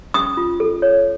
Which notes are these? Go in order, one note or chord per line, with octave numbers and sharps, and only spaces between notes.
C#4 D#6
F4
A4
C#5